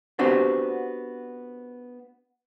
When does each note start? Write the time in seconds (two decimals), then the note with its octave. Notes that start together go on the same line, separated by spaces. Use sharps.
0.19 B3 C4 D4 F#4 G4 C5